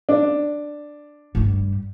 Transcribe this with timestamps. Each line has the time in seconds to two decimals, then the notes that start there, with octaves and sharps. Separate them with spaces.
0.09 D4
1.35 G2 G3